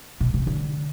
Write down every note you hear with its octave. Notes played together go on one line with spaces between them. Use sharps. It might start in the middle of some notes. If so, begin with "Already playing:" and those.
B2
C3
D3